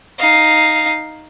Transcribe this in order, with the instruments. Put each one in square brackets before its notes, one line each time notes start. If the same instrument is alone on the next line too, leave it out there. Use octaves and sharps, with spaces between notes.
[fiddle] D#4 F5